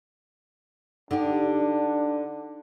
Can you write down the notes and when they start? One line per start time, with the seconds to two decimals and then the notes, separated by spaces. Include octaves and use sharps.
1.11 D3 D4 D#4 G4